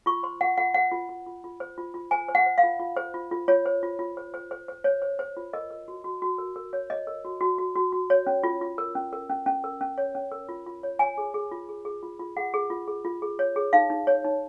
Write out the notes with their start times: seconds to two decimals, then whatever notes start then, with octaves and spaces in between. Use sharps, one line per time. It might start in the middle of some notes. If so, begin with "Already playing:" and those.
0.06 F4 C#6
0.23 C5 C6
0.41 F4 F#5
0.57 F4 F#5
0.74 C5 F#5
0.92 F4
1.09 F4
1.26 F4
1.44 F4
1.60 C5
1.78 F4
1.94 F4
2.11 C5 G#5
2.29 C5
2.35 F#5
2.46 C5
2.58 F5
2.63 F4
2.80 F4
2.96 C5
3.14 F4
3.31 F4
3.48 F4 C#5
3.66 C5
3.83 F4
3.99 F4
4.17 C5
4.34 C5
4.51 C5
4.68 C5
4.84 C5 C#5
5.02 C5
5.19 C5
5.37 F4
5.53 A#4 D#5
5.71 A#4
5.88 F#4
6.04 F#4
6.22 F#4
6.38 A#4
6.56 A#4
6.73 C#5
6.90 C#5 D#5
7.07 A#4
7.25 F#4
7.41 F#4
7.58 F#4
7.76 F#4
7.93 F#4
8.10 C#5
8.27 C#4
8.44 F4
8.61 F4
8.78 A#4
8.95 C#4
9.13 A#4
9.30 C#4
9.46 C#4
9.64 A#4
9.81 C#4
9.98 C#5
10.15 C#4
10.32 A#4
10.49 F4
10.66 F4
10.83 C#5
10.99 C#5 G#5
11.18 G#4
11.34 G#4
11.51 F4
11.69 G#4
11.85 G#4
12.03 F4
12.19 F4
12.37 G#4 F#5
12.54 G#4
12.70 F4
12.88 G#4
13.05 F4
13.22 G#4
13.39 C#5
13.56 G#4
13.73 D#4 F5
13.90 D#4
14.07 C#5
14.25 D#4